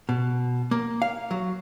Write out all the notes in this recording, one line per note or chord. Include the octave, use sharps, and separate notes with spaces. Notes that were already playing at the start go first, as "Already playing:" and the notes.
B2
A#3
F5
F#3